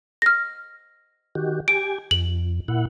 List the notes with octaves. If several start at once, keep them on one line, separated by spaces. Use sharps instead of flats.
F6 A#6
D#3 F#4 G4
G4 G#5 D7
F2 F#7
A#2 E4 F#5